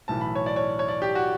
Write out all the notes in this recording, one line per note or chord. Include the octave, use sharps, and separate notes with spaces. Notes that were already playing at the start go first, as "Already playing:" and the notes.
B1 A2 E3 A5
B5
C#5
D5
C#5
C#5
D5
G4
F#4